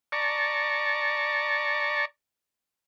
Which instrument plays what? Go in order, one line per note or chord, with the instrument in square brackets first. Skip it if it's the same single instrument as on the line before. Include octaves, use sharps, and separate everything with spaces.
[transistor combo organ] D5 A5 A#5 C#6